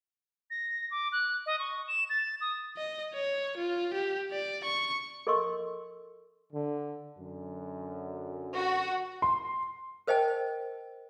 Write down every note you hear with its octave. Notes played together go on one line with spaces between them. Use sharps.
A#6
D6
F#6
D#5
C#6
E7
A6
D#6
D#5
C#5
F4
G4
D5
C#6
A4 A#4 D#5 C6 C#6 E6
D3
F#2 D3
F#4
C6
A#4 C5 D#5 G5 A5